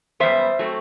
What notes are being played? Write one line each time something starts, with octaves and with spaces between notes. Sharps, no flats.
F#2 D#3 G3 B3 C5 E5
F#3 A3 C4